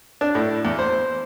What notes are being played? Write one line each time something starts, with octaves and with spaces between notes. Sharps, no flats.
D4
A2
E2
C5